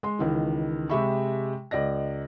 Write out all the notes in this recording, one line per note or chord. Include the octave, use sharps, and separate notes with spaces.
G#3 C6
C#2 D#3 E3
C3 G#3 G4 E5 B5 C#6
C#2 D5 D#5 A#6